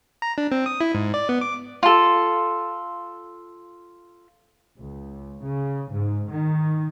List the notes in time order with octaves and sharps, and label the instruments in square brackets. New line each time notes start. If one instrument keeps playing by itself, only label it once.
[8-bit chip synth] A#5
D4
C4
D#6
E4
G#2
D5
B3
D6
[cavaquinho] F4 A4
[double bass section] C#2
C#3
G#2
D#3